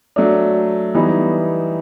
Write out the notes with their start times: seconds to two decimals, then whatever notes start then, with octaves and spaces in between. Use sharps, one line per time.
0.16 F#3 A3 D4
0.94 E3 G3 B3 D#4